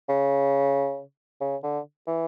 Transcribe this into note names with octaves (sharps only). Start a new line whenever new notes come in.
C#3
C#3
D3
E3